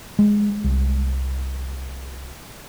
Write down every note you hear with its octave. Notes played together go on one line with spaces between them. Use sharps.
G#3
C2